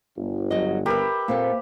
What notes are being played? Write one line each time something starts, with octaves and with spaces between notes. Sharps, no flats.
G1
F#3 D#5
G4 A#4 B4 E5
A#2 A#3 C4 A4 C5 F5